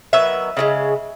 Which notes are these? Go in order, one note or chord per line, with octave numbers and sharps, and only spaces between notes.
D#3 F#3 B3 E5
C#3 E3 G#3